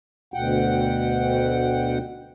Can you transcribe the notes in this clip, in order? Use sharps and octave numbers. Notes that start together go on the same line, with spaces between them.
D2 B2 F#5 G5